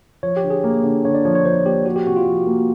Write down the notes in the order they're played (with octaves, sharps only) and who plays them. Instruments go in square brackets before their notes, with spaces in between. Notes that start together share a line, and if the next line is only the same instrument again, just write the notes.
[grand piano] F3 [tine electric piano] C#5
[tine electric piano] G4
[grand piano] D3
[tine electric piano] G#4
[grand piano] A#3
D3
[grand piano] D3 [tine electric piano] C#5
[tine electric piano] D5
[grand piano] F3 [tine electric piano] C#5
[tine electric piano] C#5
[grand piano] F3 [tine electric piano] C5
[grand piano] A#3 [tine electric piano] G4
[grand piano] F3 [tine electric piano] F#4
[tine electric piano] G4
[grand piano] C3 [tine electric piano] F#4
[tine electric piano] F4
[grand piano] F3
A#3